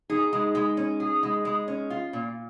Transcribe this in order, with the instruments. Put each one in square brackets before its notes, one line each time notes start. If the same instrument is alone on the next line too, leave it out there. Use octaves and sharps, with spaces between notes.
[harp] D#4 [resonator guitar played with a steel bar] G#4
[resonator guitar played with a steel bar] G#3
G#3
C#4
G#4
G#3
G#3
C#4
F4
A#2